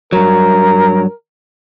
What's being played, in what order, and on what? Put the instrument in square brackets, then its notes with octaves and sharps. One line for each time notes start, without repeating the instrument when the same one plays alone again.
[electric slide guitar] G2 F#3 [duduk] A#4